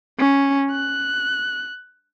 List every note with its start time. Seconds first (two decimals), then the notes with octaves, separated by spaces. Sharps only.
0.19 C#4
0.72 F#6